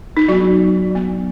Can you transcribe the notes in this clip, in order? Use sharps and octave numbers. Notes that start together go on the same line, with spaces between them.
D#4
F#3 B3 F#4
F#3 B3